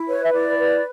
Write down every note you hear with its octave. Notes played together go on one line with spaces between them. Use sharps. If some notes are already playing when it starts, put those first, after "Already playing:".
Already playing: E4
B4 C#5
E5
E4 D5
B4